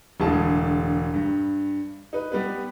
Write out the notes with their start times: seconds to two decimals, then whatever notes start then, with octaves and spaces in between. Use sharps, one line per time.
0.20 E1 A2 D3 G#4 A5
1.14 G2
2.13 D#4 B4
2.32 G3 B3 B4